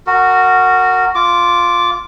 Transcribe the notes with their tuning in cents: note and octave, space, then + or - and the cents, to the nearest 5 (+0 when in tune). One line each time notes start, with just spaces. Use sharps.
F#4 +0 A#4 -25
F4 +0 D6 -10